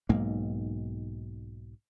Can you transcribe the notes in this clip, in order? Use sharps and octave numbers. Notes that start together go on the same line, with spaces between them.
B1 G#2 A#3